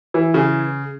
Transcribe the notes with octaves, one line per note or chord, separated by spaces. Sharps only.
E3
C#3